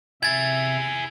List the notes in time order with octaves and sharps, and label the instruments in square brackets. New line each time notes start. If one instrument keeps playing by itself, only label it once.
[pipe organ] C3 E5 [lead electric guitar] E4 G#4 [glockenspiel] G#6 A6